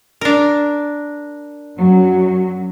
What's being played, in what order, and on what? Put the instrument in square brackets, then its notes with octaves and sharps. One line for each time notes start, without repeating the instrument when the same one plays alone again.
[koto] D4 A#4
[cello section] F#2 F#3